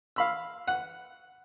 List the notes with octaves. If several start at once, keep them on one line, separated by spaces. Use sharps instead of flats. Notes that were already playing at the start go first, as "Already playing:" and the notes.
F5 B5 E6
F#5